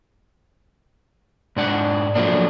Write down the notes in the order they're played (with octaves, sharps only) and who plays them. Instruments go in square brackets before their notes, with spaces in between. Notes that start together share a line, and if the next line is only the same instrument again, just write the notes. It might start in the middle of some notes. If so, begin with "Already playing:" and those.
[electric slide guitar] G#2 D4 F#5
F3 F#3 A3 A#3 D4